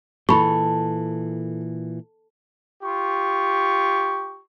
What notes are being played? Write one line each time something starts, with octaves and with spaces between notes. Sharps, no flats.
A#2 E3 A4 B5 C#6
F4 G4 C#6